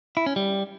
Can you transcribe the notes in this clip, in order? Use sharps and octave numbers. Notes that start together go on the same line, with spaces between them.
E4
C#4
G3